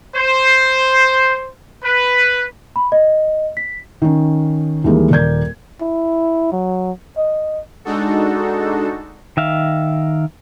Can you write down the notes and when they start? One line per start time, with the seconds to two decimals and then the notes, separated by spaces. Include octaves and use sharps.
0.16 C5
1.83 B4
2.76 B5
2.92 D#5
3.57 B6
4.02 D#3 C#4
4.84 D#2 E3 G3 G#3 A#3
5.10 D#1 A#4 D5 G6 G#6
5.81 E4
6.52 F#3
7.17 D#5
7.85 G#3 D4 D#4 F#4 A4
9.37 D#3 E5 F5